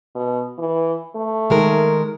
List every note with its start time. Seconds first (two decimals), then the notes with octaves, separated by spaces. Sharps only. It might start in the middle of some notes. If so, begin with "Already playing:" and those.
0.15 B2
0.59 E3
1.16 A3
1.50 D#3 G#3 A#4